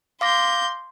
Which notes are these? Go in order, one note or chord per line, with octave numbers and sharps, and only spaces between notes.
F5 C6 D6 G6 A#6